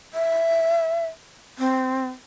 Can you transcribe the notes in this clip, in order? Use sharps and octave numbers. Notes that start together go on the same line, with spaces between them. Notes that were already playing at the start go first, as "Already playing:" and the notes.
E5
C4